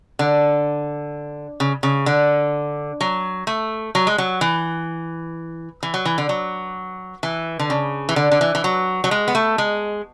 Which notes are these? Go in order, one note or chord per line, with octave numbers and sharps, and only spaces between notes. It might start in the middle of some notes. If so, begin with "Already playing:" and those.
D3
C#3
C#3
D3
F#3
A3
F#3
G#3
F#3
E3
E3
F#3
E3
D3
F#3
E3
D3
C#3
E3
D3
D3
E3
E3
F#3
F#3
G#3
B3
A3
G#3